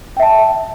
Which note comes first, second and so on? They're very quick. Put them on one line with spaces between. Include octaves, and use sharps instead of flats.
G5 E5 A5